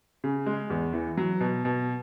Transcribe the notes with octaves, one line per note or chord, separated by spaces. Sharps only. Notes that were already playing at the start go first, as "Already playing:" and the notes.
C#3
G#3
E2
E3
F#3
B2
B2